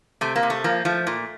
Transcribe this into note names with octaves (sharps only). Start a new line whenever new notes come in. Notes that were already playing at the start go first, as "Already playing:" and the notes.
C3 A3
A#3
C3
A3
F3 A#3
F3 A3
A#2